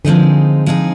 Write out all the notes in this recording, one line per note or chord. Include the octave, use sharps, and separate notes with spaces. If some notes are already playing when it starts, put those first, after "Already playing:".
D3 F3 G#3 C4 D#4 G#4
F3 G#3 C4 D#4 G#4